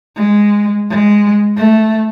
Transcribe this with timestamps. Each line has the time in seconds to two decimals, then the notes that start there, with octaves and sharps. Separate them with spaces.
0.16 G#3
0.89 G#3
1.57 A3